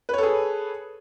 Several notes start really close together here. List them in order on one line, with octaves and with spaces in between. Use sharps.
B4 C#5 A4 G#4